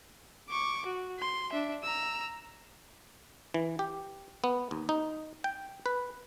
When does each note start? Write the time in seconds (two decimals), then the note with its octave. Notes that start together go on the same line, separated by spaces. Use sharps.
0.49 C#6 D6
0.86 F#4
1.19 C6
1.52 D4 E5
1.83 A#5 E6
3.54 E3
3.79 G4
4.44 B3
4.71 D#2
4.89 D#4
5.44 G5
5.86 B4